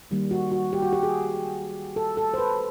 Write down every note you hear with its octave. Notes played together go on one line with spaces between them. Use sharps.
D#3 G3 A#3
F#4
F#4
G4
F#4
G4
G#4
A4
A4
C5
B4